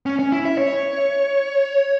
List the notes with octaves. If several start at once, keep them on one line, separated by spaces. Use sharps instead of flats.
C#4
C#4
E4
E5
C#5